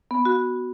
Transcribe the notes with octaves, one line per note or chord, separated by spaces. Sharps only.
B3
F#4